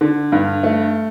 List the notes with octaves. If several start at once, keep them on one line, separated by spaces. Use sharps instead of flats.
D3
G2
A3